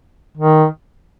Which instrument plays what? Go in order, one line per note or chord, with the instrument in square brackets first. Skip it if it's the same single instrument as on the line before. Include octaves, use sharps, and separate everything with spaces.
[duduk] D#3